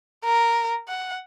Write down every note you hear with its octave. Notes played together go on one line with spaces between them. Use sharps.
A#4
F#5